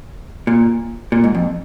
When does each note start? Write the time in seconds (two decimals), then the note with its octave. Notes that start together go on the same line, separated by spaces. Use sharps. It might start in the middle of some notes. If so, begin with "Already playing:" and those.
0.47 A#2
1.12 A#2
1.24 G#2
1.35 F2